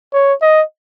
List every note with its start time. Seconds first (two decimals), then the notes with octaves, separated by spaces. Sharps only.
0.13 C#5
0.42 D#5